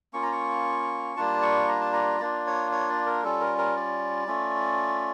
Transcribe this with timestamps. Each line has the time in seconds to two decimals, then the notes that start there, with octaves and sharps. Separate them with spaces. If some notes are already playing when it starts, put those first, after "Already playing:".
0.13 A#3 C#4 F4 C#6
0.23 A#5
0.32 C#6
1.17 G3 A#3 D4 F4 A5
1.42 C#6
1.68 A#5
1.81 A5
1.93 A#5
2.20 A#3 D4 F4 D5
2.46 C#5
2.72 C#5
2.90 D5
3.06 A#4
3.24 G3 C#4 F4 A4
3.41 A#4
3.58 A#4
3.76 D5
4.27 A3 C#4 F4